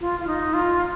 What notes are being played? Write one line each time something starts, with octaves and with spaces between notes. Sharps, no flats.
F4
F4
D#4
F4